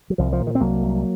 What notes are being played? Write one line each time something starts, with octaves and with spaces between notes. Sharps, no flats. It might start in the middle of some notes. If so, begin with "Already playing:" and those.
F#3
C2 F3
F3
A#2
D#3
C4
C2 F#3 A#3
C2